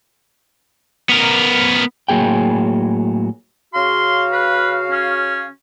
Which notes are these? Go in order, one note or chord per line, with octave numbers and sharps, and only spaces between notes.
B3 A#4
A2 F#3 A#3 G#4 G5
C#3 F#4 F5 C6
B4
C#4